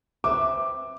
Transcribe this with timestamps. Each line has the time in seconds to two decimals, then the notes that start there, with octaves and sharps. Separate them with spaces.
0.24 C4 B4 E5 D6